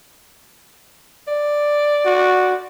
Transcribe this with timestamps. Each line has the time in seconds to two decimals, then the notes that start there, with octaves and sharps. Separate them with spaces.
1.28 D5
2.05 F#4